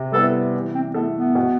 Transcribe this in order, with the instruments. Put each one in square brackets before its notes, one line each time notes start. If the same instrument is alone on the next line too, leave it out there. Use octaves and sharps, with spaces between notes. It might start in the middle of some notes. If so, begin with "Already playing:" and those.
Already playing: [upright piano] C3
[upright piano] G3 B3 E4 [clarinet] A4
[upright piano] E3
[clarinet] C4
[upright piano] A3 E4 A4 [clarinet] B3
[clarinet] B3
[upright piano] B2